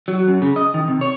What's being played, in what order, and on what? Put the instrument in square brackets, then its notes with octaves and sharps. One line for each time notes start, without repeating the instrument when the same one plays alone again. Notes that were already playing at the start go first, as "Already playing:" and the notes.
[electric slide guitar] F#3
F#2
C#3
D#5
D#3
C3
C#5